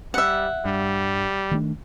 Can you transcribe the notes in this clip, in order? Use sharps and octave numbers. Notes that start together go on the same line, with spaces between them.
G3 E5 F#5
G2 G3
D#3 A3 D4